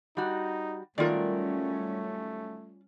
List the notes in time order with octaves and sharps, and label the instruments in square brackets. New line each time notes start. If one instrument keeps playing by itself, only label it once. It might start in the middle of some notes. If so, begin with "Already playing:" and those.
[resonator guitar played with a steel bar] G3 F#4 [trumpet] D#4
[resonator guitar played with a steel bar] D#3 F#3 A#4 [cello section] G3 C#4 [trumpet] A3 [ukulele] F4 D5